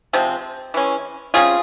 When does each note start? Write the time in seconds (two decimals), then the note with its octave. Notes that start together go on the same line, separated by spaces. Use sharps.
0.13 C3 F3 G#3 C4
0.74 E3 G#3 C#4
1.34 C3 G3 C#4 F4 G#4